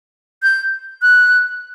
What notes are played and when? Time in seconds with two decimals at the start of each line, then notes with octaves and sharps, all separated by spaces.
0.43 G6
1.02 F#6